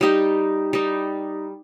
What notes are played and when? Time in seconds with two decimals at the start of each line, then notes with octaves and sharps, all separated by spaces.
0.01 G3 D#4 G4
0.73 G3 D#4